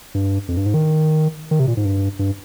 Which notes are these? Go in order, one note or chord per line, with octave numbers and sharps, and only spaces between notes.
G2
F2
G2
G#2
D#3
D#3
C3
A#2
G#2
G2
G2